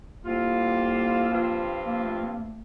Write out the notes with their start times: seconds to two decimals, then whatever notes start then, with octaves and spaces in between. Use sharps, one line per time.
0.24 A2 G3 A#3 C4 F4
1.31 G2 F3 C4 F4
1.86 A#3
2.04 A3
2.22 A#3
2.40 A3